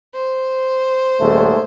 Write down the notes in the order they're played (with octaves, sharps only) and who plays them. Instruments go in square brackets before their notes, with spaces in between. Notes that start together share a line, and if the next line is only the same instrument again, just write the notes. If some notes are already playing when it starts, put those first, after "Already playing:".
[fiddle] C5
[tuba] D#1 [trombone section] G#2 G#3 A3